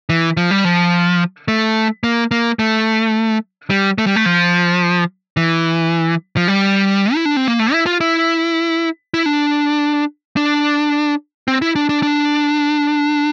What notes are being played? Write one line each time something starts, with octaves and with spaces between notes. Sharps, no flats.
E3
F3
G3
F3
A3
A#3
A#3
A3
G3
A3
G3
A3
F3
E3
F3
G3
E4
D4
C4
A#3
A3
E4
F4
E4
E4
D4
D4
C4
E4
D4
D4
D4